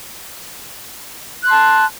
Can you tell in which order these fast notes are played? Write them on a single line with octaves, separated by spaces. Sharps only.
F#6 C6 A5